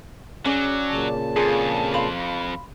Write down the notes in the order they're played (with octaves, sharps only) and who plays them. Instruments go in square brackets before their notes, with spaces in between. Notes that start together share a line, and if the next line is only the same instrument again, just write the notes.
[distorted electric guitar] F#3 [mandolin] C#4 D5 [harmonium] G#4 F#5
[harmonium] A#2 C#3 A5
[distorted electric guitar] F2 [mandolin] D4 F4 G#4
[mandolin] F5 B5 C6